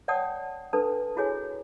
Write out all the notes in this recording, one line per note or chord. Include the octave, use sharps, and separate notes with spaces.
C#5 D5 F#5 G5 A5 D#6
D4 A4 B4 A5
E4 F#4 G#4 C#5 G#5